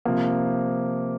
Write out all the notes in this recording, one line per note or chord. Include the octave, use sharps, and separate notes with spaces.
C3 F3 A#3